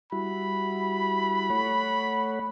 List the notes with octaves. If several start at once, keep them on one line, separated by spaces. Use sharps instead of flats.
G3 E4 F#4 B5
A3 C#5 F#5